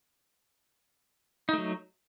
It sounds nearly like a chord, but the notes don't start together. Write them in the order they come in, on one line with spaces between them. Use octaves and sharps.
D#4 A3 F#3